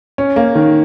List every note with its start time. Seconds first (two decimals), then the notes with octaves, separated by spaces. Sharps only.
0.18 C#4
0.36 A#3
0.55 D#3